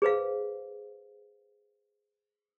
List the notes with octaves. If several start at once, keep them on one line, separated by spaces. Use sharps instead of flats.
G#4 B4 C5 F5